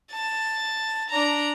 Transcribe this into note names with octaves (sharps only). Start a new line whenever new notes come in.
A5
D4 A#5